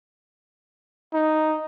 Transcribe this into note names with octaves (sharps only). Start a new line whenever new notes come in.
D#4